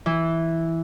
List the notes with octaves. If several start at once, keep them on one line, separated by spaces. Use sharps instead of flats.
E3